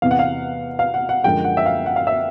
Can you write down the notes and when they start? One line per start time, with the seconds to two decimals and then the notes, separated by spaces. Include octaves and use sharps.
0.02 E2 C3 E3 F5
0.11 F#5
0.19 F5
0.79 F5
0.94 F#5
1.09 F#5
1.24 F#2 D3 F3 G#3 G5
1.44 F#5
1.57 E5
1.66 F5
1.86 F#5
1.96 F5
2.07 E5